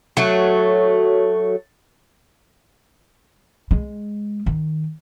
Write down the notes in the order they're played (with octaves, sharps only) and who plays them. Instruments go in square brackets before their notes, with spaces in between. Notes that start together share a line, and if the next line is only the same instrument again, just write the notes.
[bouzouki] F#3 A3
[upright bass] G#3
D#3